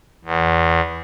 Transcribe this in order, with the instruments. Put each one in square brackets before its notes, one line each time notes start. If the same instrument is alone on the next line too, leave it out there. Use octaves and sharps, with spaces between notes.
[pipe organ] E2